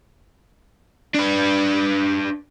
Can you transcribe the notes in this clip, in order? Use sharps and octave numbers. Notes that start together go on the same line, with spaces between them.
D4 B4